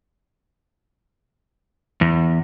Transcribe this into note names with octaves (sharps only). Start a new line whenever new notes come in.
E2